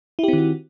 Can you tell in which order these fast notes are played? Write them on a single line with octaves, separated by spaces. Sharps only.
E4 G4 C4 D#3 F#4